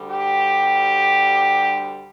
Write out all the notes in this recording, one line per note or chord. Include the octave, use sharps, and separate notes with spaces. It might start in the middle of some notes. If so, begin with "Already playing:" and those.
Already playing: D2 D3 G3
G4